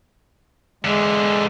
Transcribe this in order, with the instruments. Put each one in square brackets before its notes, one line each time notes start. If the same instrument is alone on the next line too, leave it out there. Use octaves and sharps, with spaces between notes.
[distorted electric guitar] E2 D3 [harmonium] G#3